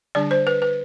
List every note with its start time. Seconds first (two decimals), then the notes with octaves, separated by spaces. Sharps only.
0.15 D3 G3 D4 D5
0.31 C5
0.47 B4
0.62 B4